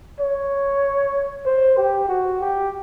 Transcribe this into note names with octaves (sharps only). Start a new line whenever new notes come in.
C#5
C5
G4
F#4
G4